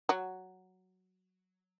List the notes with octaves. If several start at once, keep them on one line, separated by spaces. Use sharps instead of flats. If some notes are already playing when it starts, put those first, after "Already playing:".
F#3 F#4